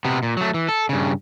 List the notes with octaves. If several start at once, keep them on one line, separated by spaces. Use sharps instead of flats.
C3 B3
A#2
F#3 A3
E3
A4
G2 C#3